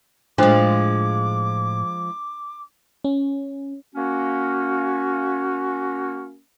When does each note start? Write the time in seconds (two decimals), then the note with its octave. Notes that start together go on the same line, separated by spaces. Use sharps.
0.38 A2 F3 G#3 D4 C5 D6
3.04 C#4
3.95 A#3 C#4 F#4